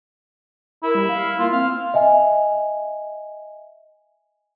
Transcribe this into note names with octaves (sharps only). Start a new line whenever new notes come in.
E4 A#4
G3
F5
A#3 F4
C4 F5
D#5 E5 G#5